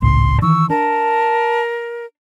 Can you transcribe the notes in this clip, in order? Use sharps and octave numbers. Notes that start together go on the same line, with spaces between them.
G#1 C#2 A2 C6
D#3 E3 C#6 E6
D4 A#4 A5